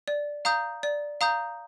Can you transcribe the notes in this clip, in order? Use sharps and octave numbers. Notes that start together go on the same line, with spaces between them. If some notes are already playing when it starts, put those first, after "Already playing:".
D5
F5 A#5 D#6 G6
D5
F5 A#5 D#6 G6